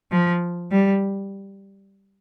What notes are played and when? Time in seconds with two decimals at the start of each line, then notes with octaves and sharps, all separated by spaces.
0.12 F3
0.72 G3